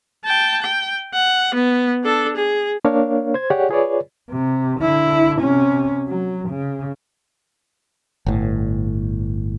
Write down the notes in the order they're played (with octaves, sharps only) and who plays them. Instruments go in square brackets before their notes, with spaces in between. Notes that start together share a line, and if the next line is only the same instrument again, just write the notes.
[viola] G5 A5
G5
F#5
B3
D4 A4
G#4
[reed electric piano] A#3 D4 A#4 C#5 F5
C5 G#6
G4 G#4 C#5 D5 F#5
F4 G#4 B4 C#5 D5
[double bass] C3
D3 E4
C3 C#4
F#3
C#3
[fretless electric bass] G1 A2